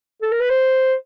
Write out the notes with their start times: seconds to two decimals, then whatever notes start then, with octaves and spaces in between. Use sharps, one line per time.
0.22 A4
0.32 A#4
0.41 B4
0.50 C5